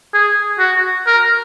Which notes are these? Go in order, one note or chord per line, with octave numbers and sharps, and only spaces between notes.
G#4
F#4
A#4